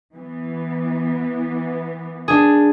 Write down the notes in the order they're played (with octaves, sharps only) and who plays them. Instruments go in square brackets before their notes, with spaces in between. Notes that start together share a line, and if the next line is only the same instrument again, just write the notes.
[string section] E3 B3
[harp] D4 G#4